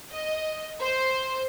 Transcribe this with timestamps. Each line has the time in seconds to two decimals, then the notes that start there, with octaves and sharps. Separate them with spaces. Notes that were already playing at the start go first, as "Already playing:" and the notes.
0.12 D#5
0.82 C5